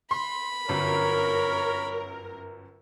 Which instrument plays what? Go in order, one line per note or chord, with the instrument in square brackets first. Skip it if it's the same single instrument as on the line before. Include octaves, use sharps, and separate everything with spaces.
[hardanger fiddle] B5 [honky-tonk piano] C6
[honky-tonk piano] G1 F#2 [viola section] A#4 [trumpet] C#5